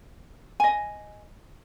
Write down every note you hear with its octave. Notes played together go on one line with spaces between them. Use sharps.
D#5 G#5